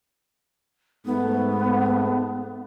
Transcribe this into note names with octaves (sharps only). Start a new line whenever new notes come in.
G#2 A3 B3